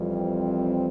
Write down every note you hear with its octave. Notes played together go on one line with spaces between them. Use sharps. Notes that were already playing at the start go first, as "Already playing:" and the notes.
Already playing: F2 E3 G3
C4